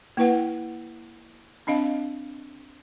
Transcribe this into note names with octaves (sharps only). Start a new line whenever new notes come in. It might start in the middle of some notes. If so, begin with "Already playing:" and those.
A#3 E4 B4 F#5
C4 D4 D#5 F5